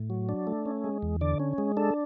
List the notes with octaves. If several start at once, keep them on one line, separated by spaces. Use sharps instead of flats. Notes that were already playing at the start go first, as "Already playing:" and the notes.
Already playing: A2
F#3
D4
A3
C#4
G#3
E2
D3 D5
C#4
G#3
D4 A4